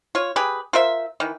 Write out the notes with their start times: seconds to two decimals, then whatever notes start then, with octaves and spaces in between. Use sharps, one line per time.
0.15 F4 C#5
0.36 G4 G#4 B4
0.73 F4 A#4 C5 E5
1.20 D#3 E3